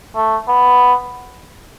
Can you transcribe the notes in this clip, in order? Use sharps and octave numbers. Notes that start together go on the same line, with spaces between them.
A3
B3